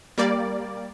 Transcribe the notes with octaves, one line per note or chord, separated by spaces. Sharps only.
G3 A#3 D5